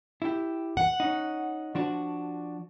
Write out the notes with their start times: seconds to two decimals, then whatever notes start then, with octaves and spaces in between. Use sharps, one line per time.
0.22 E4 G4
0.77 F#5
1.00 C#4 D#4
1.75 F3 D4 F#4